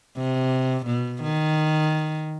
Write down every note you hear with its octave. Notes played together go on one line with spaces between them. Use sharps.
C3
B2
D#3